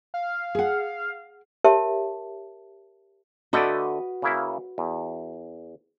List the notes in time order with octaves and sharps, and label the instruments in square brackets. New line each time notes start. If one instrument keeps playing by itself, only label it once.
[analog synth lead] F5
[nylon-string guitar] G#4 F#5
[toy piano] G4 A#4 C#5 E5 A5
[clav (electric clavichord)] D3 A3 D5 [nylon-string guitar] F#4 B4 D#5
[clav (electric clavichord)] C#3 A#3 E4
E2